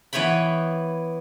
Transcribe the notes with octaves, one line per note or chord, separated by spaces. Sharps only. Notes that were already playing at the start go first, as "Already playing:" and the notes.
E3 B3 C#5 G5 B5